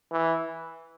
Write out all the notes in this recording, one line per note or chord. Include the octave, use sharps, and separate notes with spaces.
E3